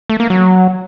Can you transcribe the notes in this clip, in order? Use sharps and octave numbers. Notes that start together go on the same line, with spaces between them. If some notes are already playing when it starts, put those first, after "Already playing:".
A3
A#3
F#3